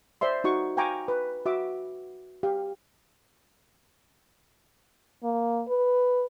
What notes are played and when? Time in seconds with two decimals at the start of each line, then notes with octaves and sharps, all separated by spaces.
0.21 C5 D5 E5 C6
0.44 D#4 F#4 C#6
0.77 F5 G5 G#5 A#5 C#6 D6
1.08 B4
1.46 F#4 E5 D6
2.43 G4 F5
5.24 A#3
5.69 B4